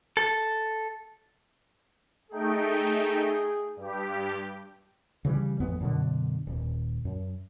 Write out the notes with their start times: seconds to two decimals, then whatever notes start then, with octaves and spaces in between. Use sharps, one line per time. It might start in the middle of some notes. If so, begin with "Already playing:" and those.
0.17 A4
2.31 A3 D#4 G#4 G5
3.76 G2 G4
5.25 C#3 E3 F#3 G3
5.60 A1 F2 B3
5.81 F#2 B2 D3
6.47 D#1
7.05 F#2